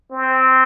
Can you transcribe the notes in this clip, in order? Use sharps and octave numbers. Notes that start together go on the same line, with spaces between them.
C4